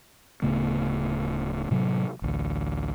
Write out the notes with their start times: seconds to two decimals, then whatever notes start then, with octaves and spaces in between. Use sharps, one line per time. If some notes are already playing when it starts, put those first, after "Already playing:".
0.42 D1 C#3 A3 B3
1.71 A2 C3 F#3
2.22 A1 D2